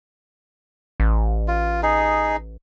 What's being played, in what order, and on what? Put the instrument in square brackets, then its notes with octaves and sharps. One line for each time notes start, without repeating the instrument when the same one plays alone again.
[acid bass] A1
[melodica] F4
D#4 G#4